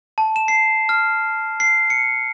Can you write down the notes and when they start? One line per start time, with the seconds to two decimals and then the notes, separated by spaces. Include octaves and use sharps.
0.18 A5
0.36 E7
0.48 C7
0.89 F6
1.60 C7
1.90 C#7